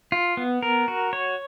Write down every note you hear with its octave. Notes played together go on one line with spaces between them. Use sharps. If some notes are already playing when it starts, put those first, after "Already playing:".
F4
B3
A#4
F#4
C#5